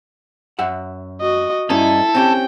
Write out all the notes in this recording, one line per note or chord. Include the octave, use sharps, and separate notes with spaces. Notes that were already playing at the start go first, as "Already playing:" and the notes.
F#2 E5 F#5
F#4 D#5
G2 C#4 D#4 E4 A4
C4 C#4 G4 G5